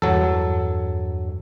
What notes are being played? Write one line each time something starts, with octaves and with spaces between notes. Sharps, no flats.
E2 G2 F#3 A4